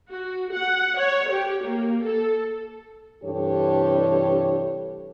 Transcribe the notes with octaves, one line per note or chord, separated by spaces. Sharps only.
F#4
F#5
C#5
G4
A#3
A4
G2 C3 E3 G4 A4 C#5